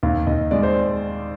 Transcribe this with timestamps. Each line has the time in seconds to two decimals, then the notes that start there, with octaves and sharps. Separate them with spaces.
0.03 D#2 F5
0.27 D#2 D#5
0.51 G#3 D5
0.63 C5